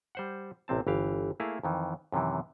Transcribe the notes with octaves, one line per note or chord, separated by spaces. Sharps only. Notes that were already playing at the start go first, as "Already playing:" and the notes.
G3 C5 F#5
A1 C3 C4 A5
G1 E3 G4 F5
A3 A#3 E4 G#4 F5
F2 D#3 E3
F#2 C3 D#3 E3